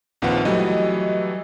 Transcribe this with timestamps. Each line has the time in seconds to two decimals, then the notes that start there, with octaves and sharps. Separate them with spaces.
0.22 A#1 D#2 C4 F4 B4 F#5
0.45 E3 F#3 G3 A3 D#5